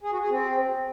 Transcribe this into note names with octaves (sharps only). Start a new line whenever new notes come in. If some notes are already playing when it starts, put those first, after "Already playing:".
G#4
F#4
G#4
C4